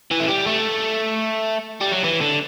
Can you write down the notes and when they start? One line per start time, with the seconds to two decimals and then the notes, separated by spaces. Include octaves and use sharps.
0.11 E3
0.20 A3
0.28 G3
0.47 A3
1.81 G3
1.92 F#3
2.04 E3
2.21 D3